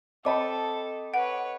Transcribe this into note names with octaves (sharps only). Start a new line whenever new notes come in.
C4 A4 D#5 G5 A5 B5 D6
B4 C#5 F#5